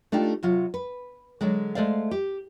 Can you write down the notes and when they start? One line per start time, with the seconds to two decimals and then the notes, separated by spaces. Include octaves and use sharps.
0.12 A3 D4 D#4 F4 G4
0.43 C3 F#3 F4
0.74 B4
1.41 D3 F#3 G#3
1.75 G#3 A3 C5 D5 F5
2.11 G4